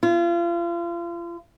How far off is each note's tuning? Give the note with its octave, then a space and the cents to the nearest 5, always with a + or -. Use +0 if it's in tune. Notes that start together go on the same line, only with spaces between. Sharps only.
F4 -35